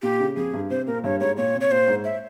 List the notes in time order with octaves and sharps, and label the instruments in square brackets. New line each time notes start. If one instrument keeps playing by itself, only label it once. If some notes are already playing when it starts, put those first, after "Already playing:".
[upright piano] A#2 [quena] G4
[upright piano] C#3
[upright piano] F2 [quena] G#4
[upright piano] G2
[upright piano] C3 [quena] C5
[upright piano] A#2 [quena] A#4
[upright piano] G2 [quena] C#5
[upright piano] G#2 [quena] C#5
[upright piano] A#2 [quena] C#5
[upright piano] C3
[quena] C#5
[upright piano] A#2 [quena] C5
[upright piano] G#2
[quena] E5